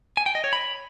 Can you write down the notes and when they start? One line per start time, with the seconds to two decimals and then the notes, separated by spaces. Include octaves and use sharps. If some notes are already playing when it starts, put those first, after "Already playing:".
0.17 G#5
0.26 G5
0.35 D#5
0.44 C#5
0.53 B5